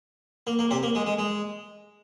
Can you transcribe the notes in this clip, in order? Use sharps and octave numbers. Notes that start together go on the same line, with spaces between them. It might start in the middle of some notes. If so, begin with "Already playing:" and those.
A#3
A#3
C3 C4
A#3
G#3
G#3
G#3